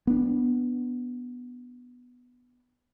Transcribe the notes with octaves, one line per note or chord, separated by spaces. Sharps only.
B3 D4